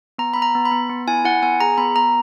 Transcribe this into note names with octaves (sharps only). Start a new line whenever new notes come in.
B3 A#5
B3 B5
A#5
B3
B5
B3
B3
E4 G#5
E4 F#5
B3 G#5
G#4 A#5
B3 B5
B3 A#5